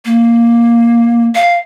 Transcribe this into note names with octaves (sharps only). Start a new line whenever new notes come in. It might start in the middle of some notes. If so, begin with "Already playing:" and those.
A#3
F5